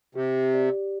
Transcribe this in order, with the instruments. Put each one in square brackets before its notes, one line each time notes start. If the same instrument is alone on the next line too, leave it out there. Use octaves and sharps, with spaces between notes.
[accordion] C3 [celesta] G4
[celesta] D5